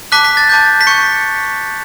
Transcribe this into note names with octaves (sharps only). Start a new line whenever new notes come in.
A5 D6 F#6 B6
B6
A6
A5 D6 G6
B6
C#6 G6 C#7